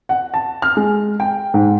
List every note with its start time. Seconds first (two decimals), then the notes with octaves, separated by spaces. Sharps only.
0.09 F#5
0.34 A5
0.62 F6
0.77 G#3
1.20 G5
1.54 G#2